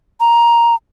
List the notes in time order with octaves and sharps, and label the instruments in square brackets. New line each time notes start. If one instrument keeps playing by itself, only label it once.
[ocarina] A#5